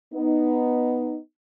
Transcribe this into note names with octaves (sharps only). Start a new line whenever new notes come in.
B3 D#4